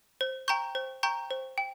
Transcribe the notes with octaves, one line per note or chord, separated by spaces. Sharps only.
C5
G5 A#5 C#6 G6
C5
G5 A#5 C#6 G6
C5
G5